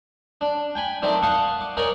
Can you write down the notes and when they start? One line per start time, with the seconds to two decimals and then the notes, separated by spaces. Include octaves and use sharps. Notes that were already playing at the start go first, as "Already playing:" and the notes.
0.41 D4
0.75 G5 G#5 B5
1.02 D#3 A3 C4 D4
1.22 F5 F#5 A5 C6 C#6 D#6
1.61 D6
1.77 D#4 A#4 C#5 D5 G#5